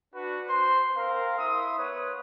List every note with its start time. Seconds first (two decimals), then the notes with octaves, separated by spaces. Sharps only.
0.14 D4 F#4 B4
0.48 C5 C6
0.96 C4 A#4 F5
1.38 E4 E5 C6 D#6
1.78 B3 B4 C#5